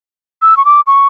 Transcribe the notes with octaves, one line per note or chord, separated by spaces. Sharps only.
E6
C#6
D6
C#6